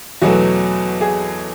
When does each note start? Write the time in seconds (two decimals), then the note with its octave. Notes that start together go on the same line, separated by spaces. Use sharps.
0.22 E2 B2 F#3 A3 F#4
1.01 G#4